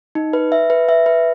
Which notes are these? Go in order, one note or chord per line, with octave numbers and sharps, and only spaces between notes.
D#4
B4
E5
B4
E5
B4